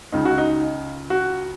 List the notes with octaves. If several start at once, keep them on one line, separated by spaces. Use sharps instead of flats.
C#2 C#3 D#4
F#4
D#4
F#4